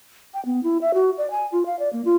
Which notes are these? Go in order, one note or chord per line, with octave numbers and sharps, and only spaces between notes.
G5
B3
E4
E5
F#4
D5
G#5
F4
F5
D5
A#3
F4